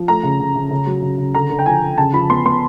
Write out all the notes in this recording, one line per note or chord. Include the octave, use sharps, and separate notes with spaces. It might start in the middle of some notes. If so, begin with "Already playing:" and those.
Already playing: F3
A3 A#5
C#3
C#3
C#3
C#3
F#3
C#3
C#3
D3 A#5
D3
G5
F3 G#5
D3
C#3 A5
F3 B5
B3 C6
B3 C6